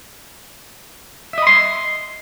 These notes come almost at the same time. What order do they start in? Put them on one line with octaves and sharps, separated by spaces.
E5 D#5 B5 C6